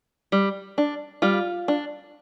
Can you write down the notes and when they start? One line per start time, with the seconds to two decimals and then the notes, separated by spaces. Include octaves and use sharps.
0.32 G3
0.78 D4
1.22 G3 F4
1.68 D4